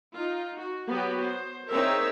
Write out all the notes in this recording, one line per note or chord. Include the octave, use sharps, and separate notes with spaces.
D#4 F4
F#4
F#3 B3 F#4 G4
C5
C4 D#4 G#4 A#4 C#5 E5